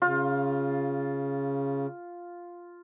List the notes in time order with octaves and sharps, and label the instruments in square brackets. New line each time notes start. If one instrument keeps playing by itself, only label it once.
[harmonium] C#3 [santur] F4